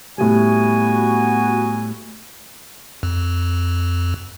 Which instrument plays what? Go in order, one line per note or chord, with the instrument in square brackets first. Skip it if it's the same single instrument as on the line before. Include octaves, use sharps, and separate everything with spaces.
[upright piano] A2 G3 [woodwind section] B3 F#4 G#5
[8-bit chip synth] F2